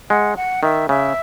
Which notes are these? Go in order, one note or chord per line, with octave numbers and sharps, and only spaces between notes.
G#3 F#5
F#5
D#3 E5
C#3 E5